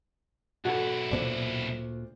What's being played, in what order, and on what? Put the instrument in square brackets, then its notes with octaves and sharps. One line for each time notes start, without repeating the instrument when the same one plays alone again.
[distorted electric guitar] B1 E4 [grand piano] F#4 A4
[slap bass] D2 A#2 A3 [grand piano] C5 D5